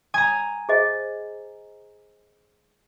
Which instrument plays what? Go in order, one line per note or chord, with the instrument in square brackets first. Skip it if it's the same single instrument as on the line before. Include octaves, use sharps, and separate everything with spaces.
[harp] G#5 A#5 [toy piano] D#6
[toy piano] G#4 C5 D#5